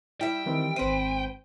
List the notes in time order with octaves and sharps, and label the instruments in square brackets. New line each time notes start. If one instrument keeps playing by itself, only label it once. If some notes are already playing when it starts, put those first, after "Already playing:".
[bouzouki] G3 E5 [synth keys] E4 [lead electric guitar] G5
[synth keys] D#3 E3 C4
[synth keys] G#1 C4 D#7 [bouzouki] B4 C5